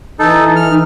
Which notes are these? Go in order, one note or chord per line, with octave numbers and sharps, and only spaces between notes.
E3 D#4 A4
F6
D#4